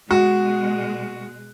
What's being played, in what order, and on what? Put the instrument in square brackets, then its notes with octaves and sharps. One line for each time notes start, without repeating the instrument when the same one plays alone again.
[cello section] B2 G#3 [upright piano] F#4